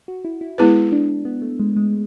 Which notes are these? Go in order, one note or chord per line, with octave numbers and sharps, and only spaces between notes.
F#4
E4
E4
G#3 B3 E4 G#4 B4
D4
B3
A3
G#3
G#3